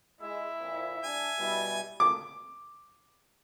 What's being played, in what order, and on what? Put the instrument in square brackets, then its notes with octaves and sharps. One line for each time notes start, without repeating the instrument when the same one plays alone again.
[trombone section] G#3 [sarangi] E4 [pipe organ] E5
[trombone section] F2 A#2
[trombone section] G3 D4 [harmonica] G#5
[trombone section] B2 E4 [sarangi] G3
[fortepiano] D6